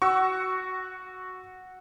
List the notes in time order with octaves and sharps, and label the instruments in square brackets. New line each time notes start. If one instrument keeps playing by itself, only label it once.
[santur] F#4 [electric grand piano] C#6 E6